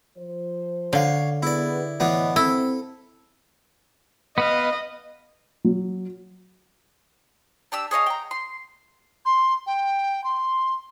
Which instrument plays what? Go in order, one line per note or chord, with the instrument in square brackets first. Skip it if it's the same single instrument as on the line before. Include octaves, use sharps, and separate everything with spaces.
[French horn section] F3 C5
[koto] D3 [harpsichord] C#5 F5
[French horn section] B3 G#4 [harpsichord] E4 D5
[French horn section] A2 C#5 D#5 [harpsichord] E3 B3 D4
[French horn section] C4 [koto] E4 [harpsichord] A4
[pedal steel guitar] B3 B4 F5 [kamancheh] D#5
[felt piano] F#3
[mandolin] D4 G4 E6
G#4 C#5 D#5 F5
G5 A#5
C6
[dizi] C6
G5
C6